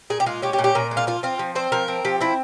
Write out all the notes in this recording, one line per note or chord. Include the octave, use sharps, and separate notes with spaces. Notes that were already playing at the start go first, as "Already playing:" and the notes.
A#2 G#4
G4
G#3 F4
C#4 G4
G4
A#2
G4
A#2 A#4
G#3
F4
F3 F4
C4 F4
F3
C4 C5
F3 A#4
C4
F3 G4
C4 E4